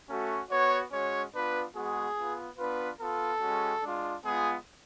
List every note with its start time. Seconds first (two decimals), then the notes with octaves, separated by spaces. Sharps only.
0.08 A3 C#4 F#4
0.50 B3 F#4 C#5
0.91 G#3 C#4 F#4 C#5
1.33 B3 D4 F4 B4
1.74 G#3 B3 F#4 G#4
2.16 B3 F4
2.57 B3 D4 F4 B4
2.98 B3 F4 A4
3.40 G#3 C#4 F#4
3.81 G#3 D4 F4
4.23 G#3 B3 F4 G#4